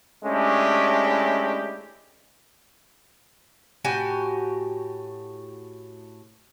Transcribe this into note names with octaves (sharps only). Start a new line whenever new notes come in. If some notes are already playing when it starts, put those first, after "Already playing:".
G#3 A3 C#4 D4 E4 G4
A2 F#4 G4 G#5